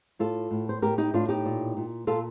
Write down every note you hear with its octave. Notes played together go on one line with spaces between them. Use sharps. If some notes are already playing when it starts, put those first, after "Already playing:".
A2 F4 A4
A2
C5
A2 G4 A#4
D#4 G4
A2 D4 F4
D#4 G4
A#2
A#2
A#2 F4 A4